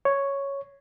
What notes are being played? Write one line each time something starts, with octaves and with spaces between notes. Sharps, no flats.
C#5